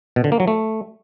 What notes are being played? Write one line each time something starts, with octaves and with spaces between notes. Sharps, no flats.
B2
D3
A#3
F#3
A3